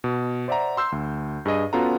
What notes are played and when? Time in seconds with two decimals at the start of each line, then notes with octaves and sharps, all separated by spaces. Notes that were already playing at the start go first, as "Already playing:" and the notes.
0.04 B2
0.48 C5 D5 E5 F#5 A#5
0.77 C6 E6 G6 C7
0.92 D2
1.45 G2 G#4 D#5 D#7
1.73 B3 C#4 F4 F#4 A4 A#5